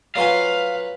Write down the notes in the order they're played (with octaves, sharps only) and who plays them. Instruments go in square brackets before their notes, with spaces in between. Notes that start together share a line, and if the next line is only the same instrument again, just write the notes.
[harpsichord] F#3 F4 G#5 [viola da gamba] B4 [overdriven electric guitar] F5